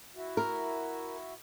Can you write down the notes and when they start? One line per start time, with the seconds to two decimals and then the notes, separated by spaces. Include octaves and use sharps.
0.15 E4 F#4
0.37 A#4